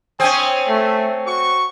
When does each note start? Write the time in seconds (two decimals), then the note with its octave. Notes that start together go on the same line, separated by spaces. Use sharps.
0.20 C4 C#4 C#5 G#5 D#6
0.67 A3
1.26 F#4 C#6